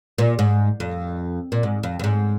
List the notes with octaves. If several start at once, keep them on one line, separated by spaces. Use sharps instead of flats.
A#2
G#2
F2
A#2
G#2
F2
F2
G#2